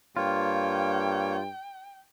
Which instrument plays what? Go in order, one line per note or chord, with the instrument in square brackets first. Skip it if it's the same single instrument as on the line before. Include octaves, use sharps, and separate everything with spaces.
[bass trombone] G2 [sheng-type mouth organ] A#3 C#5 [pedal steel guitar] F4 [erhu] G5